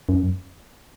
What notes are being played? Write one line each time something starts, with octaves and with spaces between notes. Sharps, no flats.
F#2